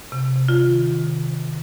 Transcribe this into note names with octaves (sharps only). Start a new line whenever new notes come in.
C3
C3
F4
D#3
D#3
C3
D#3